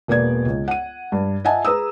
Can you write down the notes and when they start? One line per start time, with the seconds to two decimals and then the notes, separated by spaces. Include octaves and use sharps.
0.08 E1 A#3 B3 D5 G#6
0.46 C#2
0.68 F#5 D#7
1.12 G2
1.45 D#5 E5 F#5 G#5 A5
1.65 G#4 B4 A#5 D#6 E6